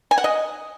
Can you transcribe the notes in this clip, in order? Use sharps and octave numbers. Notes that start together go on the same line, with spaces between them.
G#5
F#5
D#5